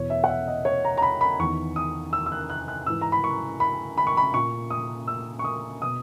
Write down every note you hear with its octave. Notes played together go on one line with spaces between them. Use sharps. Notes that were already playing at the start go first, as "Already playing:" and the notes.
Already playing: E2 B2 C#5
E5
F#5
E5
D#5
C#5
A#5
A#5
B5
B5
E2 D#3 C#6
D#6
E6
E6
F#6
F#6
F#6
G#2 E3 E6
A#5
B5
C#6
B5
B5
C#6
B5
A#2 C#6
D#6
E6
C#6
D#6
B2 D#6